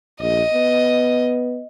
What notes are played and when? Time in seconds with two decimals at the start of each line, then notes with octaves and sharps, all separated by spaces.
0.20 A#1 D#5
0.54 B3